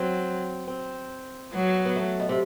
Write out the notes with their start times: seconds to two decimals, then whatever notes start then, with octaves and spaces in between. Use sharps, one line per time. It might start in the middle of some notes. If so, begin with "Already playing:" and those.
Already playing: F#3 C4
0.67 C4
1.53 F#3 B3
1.85 B3
1.96 A3
2.20 B2
2.29 C3